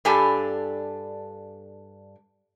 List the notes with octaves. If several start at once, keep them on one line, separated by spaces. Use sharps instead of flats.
G2 D4 G4 A4 G#5 A5